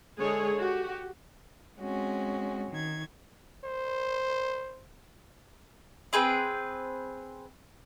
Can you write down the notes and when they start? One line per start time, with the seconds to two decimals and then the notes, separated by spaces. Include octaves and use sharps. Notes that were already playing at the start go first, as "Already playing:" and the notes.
0.19 D3 G#3 G#4 A4 C#5
0.60 F#4 G4
1.78 G#3 C4 C#4 F#4
2.71 D#3 G#6
3.64 C5
6.13 C4 G#4 B4 G5